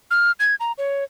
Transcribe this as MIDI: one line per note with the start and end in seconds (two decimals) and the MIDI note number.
0.11 0.32 89
0.40 0.55 92
0.60 0.72 82
0.78 1.04 73